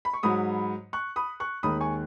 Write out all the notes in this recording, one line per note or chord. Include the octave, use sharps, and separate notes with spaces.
B5
C#6
G#2 F#3 B5 D#6
C#6 F#6
B5 D#6
C#6 F#6
D#2 D#3 G#3 B5 D#6
G#5 C#6